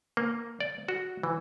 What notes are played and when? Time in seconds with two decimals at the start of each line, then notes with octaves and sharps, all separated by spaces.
0.17 A#3
0.60 D5
0.88 F#4
1.23 E3